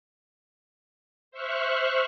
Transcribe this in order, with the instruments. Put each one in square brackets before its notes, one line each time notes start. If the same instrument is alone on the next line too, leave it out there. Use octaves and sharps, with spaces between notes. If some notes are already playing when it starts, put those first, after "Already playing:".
[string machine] C5 E5 C#6 F6 F#6